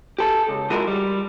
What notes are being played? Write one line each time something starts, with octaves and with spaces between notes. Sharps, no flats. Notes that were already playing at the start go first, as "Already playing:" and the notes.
G4 A4
C#2
E3 G#3 F4 F#4 A#4
G3